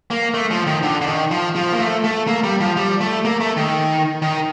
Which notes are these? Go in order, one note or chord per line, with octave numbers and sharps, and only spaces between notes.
A#3
A3
F3
D#3
D3
D3
D#3
F3
F3
A#3
A3
A3
A#3
G3
F3
G3
A3
A#3
A3
D#3
D#3